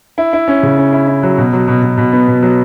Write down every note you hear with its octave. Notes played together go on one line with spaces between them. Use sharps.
E4
E4
C#4
C#3
C#4
E4
E4
F#3
B2
F#3
B2
B2
B2
B3
B2
F#3